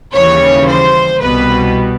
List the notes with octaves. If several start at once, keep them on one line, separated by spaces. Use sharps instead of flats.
D#2 C#3 E3 G3 C#5
C5
C2 B2 G3 B3 B4